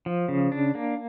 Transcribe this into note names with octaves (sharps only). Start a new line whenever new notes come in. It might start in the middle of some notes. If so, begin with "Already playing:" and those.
F3
C#3
D4
A#3